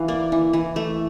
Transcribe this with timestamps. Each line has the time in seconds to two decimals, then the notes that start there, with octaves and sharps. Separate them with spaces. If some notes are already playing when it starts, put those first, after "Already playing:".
Already playing: E3 F5
0.08 A#3 D5
0.32 E3
0.53 E3
0.76 A3